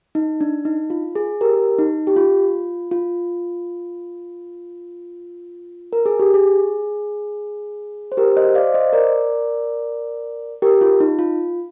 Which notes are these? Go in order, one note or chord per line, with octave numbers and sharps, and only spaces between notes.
D#4
D4
D#4
F4
G#4
G4 A#4
D#4
G4
F4
F4
A#4
G#4
G4
G#4
C5
G4 A#4
C5 D#5
D5 F5
C5 D#5
A#4 D5
G4 A#4
F4
D#4
F4